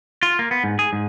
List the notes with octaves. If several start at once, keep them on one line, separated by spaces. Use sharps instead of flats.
F4
A#3
B3
G#2
G#4
G#2